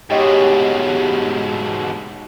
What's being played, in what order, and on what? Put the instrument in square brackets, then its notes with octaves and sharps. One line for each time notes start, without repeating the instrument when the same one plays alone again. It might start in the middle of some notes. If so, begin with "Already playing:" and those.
[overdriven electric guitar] G#2 B2 [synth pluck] G4 C#5 D#5